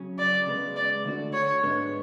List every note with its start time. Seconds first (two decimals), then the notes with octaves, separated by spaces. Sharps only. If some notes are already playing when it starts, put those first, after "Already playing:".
Already playing: C#3 F#3 C#4
0.19 D5
0.46 C#3 G#3 B3
0.76 D5
1.05 D2 D3 A3 D4 F#4
1.33 C#5
1.63 G#2 G#3 B3 D4